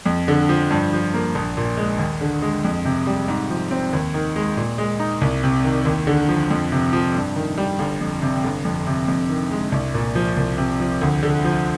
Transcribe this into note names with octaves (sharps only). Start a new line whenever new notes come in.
F2
D3
F3
G2
F3
A#3
A#1
A#2
G#3
D#2
D3
G#3
F2
C3
G3
G#2
F3
C4
D#2
D#3
G#3
A#2
G#3
D#4
C2
C3
D#3
D#2
D3
F3
F2
C3
F3
G2
D#3
G3
G1
F2
C3
G1
F2
C3
F2
D#3
G#3
C2
A#2
F3
C2
C3
F3
D2
D3
F3